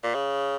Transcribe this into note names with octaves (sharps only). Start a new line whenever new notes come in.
A#2
C#3